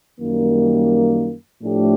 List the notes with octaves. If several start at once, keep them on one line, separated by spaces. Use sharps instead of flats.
F#2 D#3 G3 A#3
A2 F3 A3 D4 G4